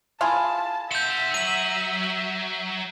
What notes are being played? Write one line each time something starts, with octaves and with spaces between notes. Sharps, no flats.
E4 F4 G#4 A5
E5 F#5 C6 G6 E7
F#3 D#7 F#7